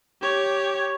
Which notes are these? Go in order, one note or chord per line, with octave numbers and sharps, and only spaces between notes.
G4 C#5